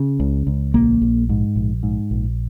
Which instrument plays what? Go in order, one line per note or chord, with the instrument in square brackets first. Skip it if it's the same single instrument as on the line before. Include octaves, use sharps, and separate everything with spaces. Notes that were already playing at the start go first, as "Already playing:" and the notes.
Already playing: [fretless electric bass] C#3
C#2
C#2
A#1 A#3
A#1
G#2
A#1
G#2
A#1